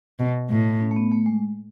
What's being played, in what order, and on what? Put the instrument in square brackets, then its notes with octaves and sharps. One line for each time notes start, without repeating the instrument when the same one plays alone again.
[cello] B2
A2
[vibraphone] C#4
A3
B3
A3
G#3